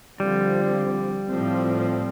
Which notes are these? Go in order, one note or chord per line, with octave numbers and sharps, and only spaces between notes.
D3 F3 G3 C4
A2 F3 C4